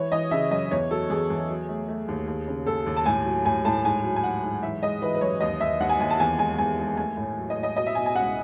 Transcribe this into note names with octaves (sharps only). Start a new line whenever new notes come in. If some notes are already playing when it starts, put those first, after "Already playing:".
Already playing: E3 C#5
E3 D#5
C#3 E5
F#2 D#5
E2 C#5
F#3 A4
E2 G#4
E2
F#3
A3
A3
D#2
D#2
C#3
D#2 A4
D#2
A5
A2 G#5
F#3
A2 G#5
A2 A5
G#2 G#5
F#3
G#5
F#3 F#5
G#2
E3 E5
G#3 D#5
E3 B4
B4
F#2 C#5
D#2 D#5
D#2 E5
D#2 F#5
G#5
D#2 G#5
A5
E2 G#5
G#3 G#5
E2 G#5
G#3
A3 G#5
A2
F#3
D#5
A2
D#5
B2 D#5
E5
B2 G#5
G#5
C#2 F#5